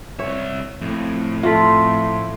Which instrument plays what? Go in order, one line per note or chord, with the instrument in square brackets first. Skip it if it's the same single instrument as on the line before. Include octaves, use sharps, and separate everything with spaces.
[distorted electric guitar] C2 E5 [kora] C#5
[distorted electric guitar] F2 [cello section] A2
[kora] A3 F4 [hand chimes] E5 C6 B6